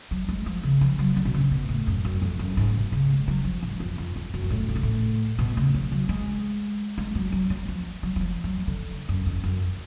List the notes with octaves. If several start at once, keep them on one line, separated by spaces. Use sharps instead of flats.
F#3
G#3
F3
C#3
F3
F#3
D3
B2
C#3
B2
A2
F#2
F#2
F2
F#2
G#2
B2
C#3
G#3
F#3
F3
G#2
F2
F2
F2
F#2
G#2
A2
A2
B2
A2
B2
C#3
F3
F#3
G#3
G#3
F#3
F#3
F#3
F3
F#3
F#3
F3
F#3
D3
F#2
F2
F#2